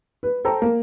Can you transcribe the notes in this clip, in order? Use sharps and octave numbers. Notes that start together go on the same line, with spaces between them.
B4
A4 C5 G5 A#5
A#3